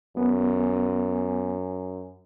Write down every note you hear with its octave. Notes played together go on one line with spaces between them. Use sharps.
F#2 B3